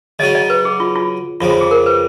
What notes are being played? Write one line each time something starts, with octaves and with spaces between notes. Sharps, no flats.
C#3 F#3 C#4 D#5
D#5
B4
G#4
F4
F4
F2 C#3 F3 F4
F4
G#4
A#4
B4